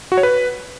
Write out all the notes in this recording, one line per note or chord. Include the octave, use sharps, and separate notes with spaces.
F#4
C#5
B4